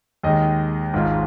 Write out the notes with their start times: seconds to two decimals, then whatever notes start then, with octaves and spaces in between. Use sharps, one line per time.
0.23 D#2 D#3 G#3 D#5
0.94 G#1 G#2 G#3 F4